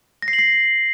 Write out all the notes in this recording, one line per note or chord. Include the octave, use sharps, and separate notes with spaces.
A#6
C7
F#7
C7